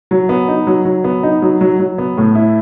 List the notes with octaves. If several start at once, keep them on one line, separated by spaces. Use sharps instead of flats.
F#3
B3
D#4
F#3
F#3
B3
D#4
F#3
F#3
F#3
B3
A2
E4